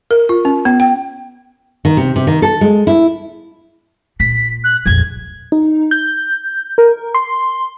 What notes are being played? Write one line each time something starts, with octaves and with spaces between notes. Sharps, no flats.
A#4
F4
C#4
B3
G5
D#3
C3
C3
D#3
A4
G#3
E4
A#2 B6
F#6
A#1 F2 G#6
D#4
G6
A#4
C6